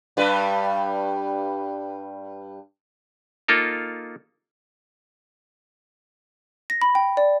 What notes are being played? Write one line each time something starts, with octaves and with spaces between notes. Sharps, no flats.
G2 G3 B4
A#3 D#4 F4 A4 A#4
A#6
B5
G5
D5